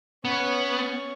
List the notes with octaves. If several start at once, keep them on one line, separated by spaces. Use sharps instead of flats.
B3 C#4 C#5